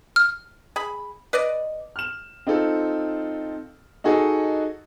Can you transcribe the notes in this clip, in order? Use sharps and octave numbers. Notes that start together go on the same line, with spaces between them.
F6
G#4 B5
B4 D5 D#5
F6 E7
C4 D#4 F4 A4
D#4 F#4 G#4 A4 D#5